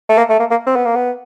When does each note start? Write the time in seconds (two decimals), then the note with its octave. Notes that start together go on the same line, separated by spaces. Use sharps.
0.09 A3
0.18 A#3
0.30 A3
0.40 A#3
0.51 A#3
0.67 C4
0.76 B3
0.86 A#3
0.96 B3